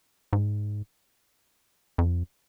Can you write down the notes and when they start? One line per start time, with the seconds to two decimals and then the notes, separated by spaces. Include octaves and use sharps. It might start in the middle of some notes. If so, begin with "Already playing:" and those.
0.33 G#2
1.98 F2